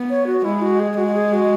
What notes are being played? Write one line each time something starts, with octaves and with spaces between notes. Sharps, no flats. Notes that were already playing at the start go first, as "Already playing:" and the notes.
Already playing: B3
C#5
F#4
G#3 E4
F#4
G#4
G#3 F#4
F#4
G#4
F#4